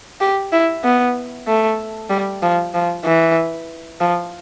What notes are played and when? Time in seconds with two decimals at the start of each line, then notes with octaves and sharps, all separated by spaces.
0.21 G4
0.53 E4
0.84 B3
1.47 A3
2.10 G3
2.43 F3
2.74 F3
3.05 E3
4.01 F3